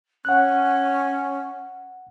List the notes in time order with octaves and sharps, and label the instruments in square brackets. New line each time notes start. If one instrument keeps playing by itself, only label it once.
[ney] C#4 [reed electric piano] F#5 F#6